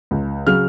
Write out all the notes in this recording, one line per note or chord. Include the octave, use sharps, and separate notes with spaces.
C#2
C#3 F#3 F6